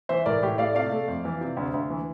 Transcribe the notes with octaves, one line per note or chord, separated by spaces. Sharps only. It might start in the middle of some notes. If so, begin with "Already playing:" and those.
E3 C5 E5
A2 A#4 D5
A2 G4
A3 D5 F5
C3 D5 F5
A3
F2
E3
C3
D2
D2
E3